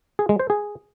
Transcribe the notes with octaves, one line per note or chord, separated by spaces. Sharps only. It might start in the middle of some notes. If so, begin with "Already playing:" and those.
G#4
G#3
C5
G#4